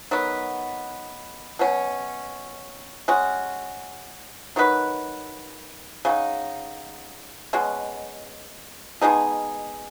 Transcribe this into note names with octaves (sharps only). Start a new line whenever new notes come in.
D#3 F#3 B3
B2 F#3 C#4
G#3 C#4 F#4
D#3 F#3 D#4 B4
C#3 F#3 D#4
B2 G#3 C#4 F#4
B2 G#3 D#4 G#4